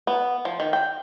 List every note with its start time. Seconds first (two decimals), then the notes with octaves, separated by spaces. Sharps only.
0.07 B3
0.45 F3
0.60 D#3
0.73 G5